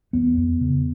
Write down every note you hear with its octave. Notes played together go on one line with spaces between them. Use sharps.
E2 B3
E2
C#3